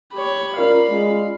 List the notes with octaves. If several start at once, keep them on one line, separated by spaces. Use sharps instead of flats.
G4 C#5 B5
C#4 F4 A#4 D5 F5
G#3